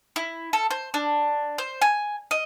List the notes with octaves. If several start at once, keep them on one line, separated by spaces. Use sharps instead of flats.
E4
A4
C5
D4
C5
G#5
D#5